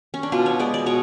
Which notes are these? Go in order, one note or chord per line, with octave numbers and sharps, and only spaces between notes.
C#4
D4
B2 F4
C#5
G#3 B3 D5
D5
B2 C#5